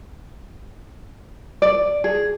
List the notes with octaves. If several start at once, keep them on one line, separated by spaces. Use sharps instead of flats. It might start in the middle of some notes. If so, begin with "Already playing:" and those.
D5
G#4